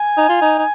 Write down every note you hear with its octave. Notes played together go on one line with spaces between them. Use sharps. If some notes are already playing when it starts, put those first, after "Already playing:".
Already playing: G#5
D#4
F4
D#4
D#4